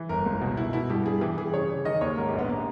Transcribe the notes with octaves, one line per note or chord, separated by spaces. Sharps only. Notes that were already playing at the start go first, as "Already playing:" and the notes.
Already playing: E3
G1 A#4
C#2
B2
B2 E4
B2 E4
G2 G4
G2 G#4
E3 G4
E3 G#4
C#3 C#5
C#3
D#3 D#5
D#2 C#5
G#2 A#4
G4
A#1
B3
A#3